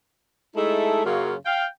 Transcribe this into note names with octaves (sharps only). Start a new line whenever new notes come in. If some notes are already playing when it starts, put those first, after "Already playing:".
G#3 A3 D#4 E4 A4
F#2 C#3 F#3 A#3 F4 C#5
F5 G5